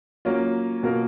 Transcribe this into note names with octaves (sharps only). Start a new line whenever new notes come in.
F#3 A#3 C#4 F4
B2 A#3 F4 A#4